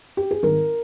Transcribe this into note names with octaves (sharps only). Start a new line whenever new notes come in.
G4
G#4
G#1 A#4